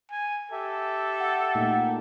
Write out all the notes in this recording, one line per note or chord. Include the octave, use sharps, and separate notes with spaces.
G#5
G4 A4 E5
F#5
A#2 A3 D#4